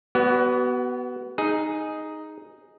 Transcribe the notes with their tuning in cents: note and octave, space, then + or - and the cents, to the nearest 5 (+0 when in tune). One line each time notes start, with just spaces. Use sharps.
B3 +0 F#4 +35 D5 -40
D#4 +0 G#4 +0